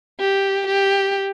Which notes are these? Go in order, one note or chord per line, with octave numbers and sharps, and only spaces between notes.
G4
G4